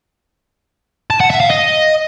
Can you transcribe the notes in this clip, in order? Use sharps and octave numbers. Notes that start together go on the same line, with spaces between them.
A5
F#5
E5
F5
D#5